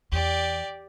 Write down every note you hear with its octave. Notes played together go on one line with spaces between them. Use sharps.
E2 G4 D5